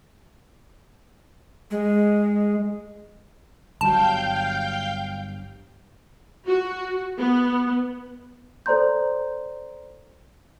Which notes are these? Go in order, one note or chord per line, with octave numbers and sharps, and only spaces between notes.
G#3
G1 G2 F#3 F5 G5 A5 G6
F#4
B3
A4 C5 D5 A#5 C6 G6